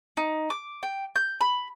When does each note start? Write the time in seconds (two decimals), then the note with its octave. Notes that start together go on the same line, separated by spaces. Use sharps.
0.17 D#4
0.50 D6
0.83 G5
1.16 G6
1.41 B5